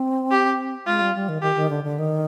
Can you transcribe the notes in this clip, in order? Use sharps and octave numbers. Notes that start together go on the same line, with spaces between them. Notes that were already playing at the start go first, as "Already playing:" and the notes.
Already playing: C4
G4
G#3 F4
G3
G3
D#3
D#3 G4
D#3
D3
D3
D#3